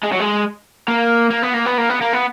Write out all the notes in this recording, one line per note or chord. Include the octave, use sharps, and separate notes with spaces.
G#3
F#3
G#3
A#3
A#3
B3
A#3
B3
A#3
B3
A#3
B3